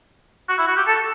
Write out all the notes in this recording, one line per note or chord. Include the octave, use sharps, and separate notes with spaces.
F#4
E4
F#4
G4
A4